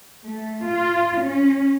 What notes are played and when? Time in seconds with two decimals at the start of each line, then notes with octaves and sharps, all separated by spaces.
0.24 A3
0.68 F4
1.24 C#4